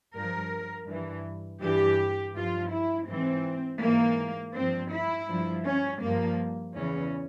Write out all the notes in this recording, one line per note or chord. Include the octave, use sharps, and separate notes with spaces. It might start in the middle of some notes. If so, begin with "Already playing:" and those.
G2 F3 A#4
G2 E3
G2 E3 G4
G2 F3 F4
E4
G#2 E3 C4
G#2 E3 A#3
G2 F3 C4
E4
G2 F3
C#4
G2 F3 A#3
E2 C#3 E3 C#4